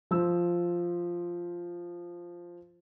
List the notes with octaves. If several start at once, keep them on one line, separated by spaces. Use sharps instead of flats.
F3 E6